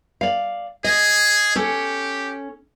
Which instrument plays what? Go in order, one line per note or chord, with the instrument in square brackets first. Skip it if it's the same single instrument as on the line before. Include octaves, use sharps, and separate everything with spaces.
[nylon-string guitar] D5 F5
[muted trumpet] G#4 [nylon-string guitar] D#5
[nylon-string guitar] C#4 A4 [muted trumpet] G4